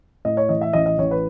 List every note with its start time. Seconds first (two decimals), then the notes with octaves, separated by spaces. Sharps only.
0.25 A2 D#5
0.37 C#5
0.49 E3 D#5
0.61 E5
0.73 A1 D#5
0.86 D#5
0.98 A1 C#5
1.11 B4